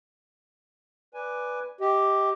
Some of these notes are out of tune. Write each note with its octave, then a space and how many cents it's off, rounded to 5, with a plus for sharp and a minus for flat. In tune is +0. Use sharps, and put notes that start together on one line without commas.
B4 +0 D5 +0 G#5 +0
G4 +0 D#5 +25